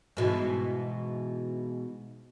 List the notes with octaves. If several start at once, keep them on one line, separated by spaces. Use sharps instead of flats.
G#2 B2 E3